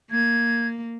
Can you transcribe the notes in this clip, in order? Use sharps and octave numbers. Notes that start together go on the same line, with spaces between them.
A#3 G#6